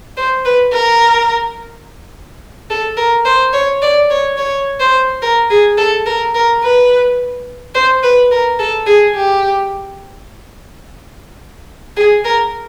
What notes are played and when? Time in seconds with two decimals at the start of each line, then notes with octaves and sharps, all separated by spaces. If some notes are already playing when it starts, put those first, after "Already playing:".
0.17 C5
0.45 B4
0.72 A#4
2.70 A4
2.97 A#4
3.25 C5
3.53 C#5
3.82 D5
4.10 C#5
4.37 C#5
4.80 C5
5.22 A#4
5.50 G#4
5.78 A4
6.06 A#4
6.35 A#4
6.63 B4
7.75 C5
8.03 B4
8.31 A#4
8.59 A4
8.86 G#4
9.15 G4
11.96 G#4
12.24 A#4